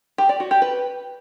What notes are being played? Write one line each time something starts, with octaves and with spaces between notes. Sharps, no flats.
G4
D5
F#4
G4
B4